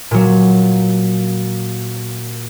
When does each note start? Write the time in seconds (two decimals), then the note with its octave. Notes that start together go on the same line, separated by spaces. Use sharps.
0.11 A#2 F#3